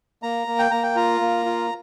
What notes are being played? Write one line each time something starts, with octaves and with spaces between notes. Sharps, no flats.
A#3 A#5
A#3
G5
A#3 A#5
G5
F4 A#5
A#3
F4